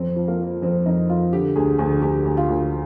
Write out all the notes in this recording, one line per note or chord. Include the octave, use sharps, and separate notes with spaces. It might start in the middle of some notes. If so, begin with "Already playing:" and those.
Already playing: F2 C4
F3
A#3
F3
F2 C4
F2 D#4
F2 F4
D3 G4
D2 G#4
D2 G#4
D2 G4
D2
F4
D2